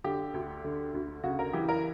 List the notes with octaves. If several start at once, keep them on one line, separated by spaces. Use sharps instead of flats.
D3 G4
D2
D3
D2
C#3 F#4
A#4
E3 G4
A#4